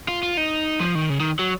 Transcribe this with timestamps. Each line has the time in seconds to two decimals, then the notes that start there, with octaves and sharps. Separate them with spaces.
0.08 F4
0.23 F4
0.37 D#4
0.80 F3
0.95 D#3
1.10 C#3
1.20 D#3
1.39 F#3